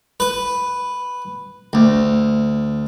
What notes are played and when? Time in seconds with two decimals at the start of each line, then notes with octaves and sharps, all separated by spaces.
0.20 B4
1.73 D2